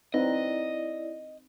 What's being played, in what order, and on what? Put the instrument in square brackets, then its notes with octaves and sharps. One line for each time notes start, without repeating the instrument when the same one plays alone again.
[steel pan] C4 D#4 B4 [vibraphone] E4 D5 [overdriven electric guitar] D#5